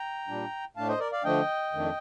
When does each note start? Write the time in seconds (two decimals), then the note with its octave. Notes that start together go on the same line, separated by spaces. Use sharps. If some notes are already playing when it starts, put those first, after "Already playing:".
Already playing: G5 A#5
0.28 A#2 G3 D4
0.77 A2 A3 D4 F5 A5
0.88 C5 D#5
1.00 A#4 D5
1.12 D5 F5
1.24 D3 F3 A3 D4 D#5 G5
1.73 F2 D#3 A3 D4